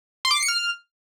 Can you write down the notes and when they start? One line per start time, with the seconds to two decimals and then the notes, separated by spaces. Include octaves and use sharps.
0.25 C6
0.31 D6
0.37 C7
0.42 C#7
0.48 F6